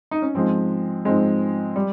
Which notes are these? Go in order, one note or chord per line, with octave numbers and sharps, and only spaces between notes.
D#4
C#4
G#2 F3 G#3 C4
G#2 F3 G#3 C4
G3